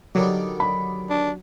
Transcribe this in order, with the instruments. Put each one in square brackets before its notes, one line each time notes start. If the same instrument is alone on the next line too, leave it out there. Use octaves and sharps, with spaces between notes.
[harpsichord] D3 D#3 G3 [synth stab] F#3
[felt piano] B5
[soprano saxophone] D4